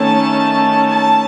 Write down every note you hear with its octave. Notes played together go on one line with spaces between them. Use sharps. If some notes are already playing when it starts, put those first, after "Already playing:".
Already playing: D#3 A3 C#4 A5
A5